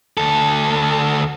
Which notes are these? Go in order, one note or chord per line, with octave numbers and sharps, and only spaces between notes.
D2 A4